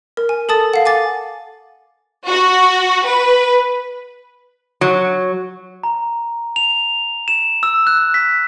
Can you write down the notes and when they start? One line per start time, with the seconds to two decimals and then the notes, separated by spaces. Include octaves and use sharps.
0.17 A#4
0.29 G#5
0.49 A4 A5 D#6 A6
0.74 F5 F#5
0.86 G#5 D6 A6
2.29 F#4
3.05 B4
4.81 F#3
5.84 A#5
6.56 F7
7.28 E7
7.63 E6
7.87 F#6
8.14 B6